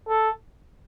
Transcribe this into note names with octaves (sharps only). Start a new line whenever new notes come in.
A4